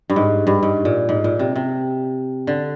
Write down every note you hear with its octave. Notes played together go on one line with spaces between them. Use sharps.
G2
G#2
G2
G#2
A#2
G#2
A#2
C3
C3
D3